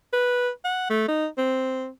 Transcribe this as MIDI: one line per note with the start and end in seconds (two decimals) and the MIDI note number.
0.13 0.50 71
0.64 0.90 78
0.90 1.06 57
1.08 1.27 63
1.38 1.88 60